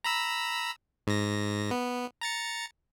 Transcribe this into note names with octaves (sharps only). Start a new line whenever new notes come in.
A#5 B5 E6
G#2 A#6
B3
A#5 A6 C#7